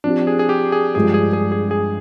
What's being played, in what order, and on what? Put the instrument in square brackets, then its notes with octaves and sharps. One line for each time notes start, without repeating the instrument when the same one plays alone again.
[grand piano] F3 C4 G4 [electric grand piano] D4
[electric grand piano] G#4
G#4
G4
G#4
[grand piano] G2 F3 G#3 D4 [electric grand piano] G#4
[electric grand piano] G#4
G#4
G#4
G#4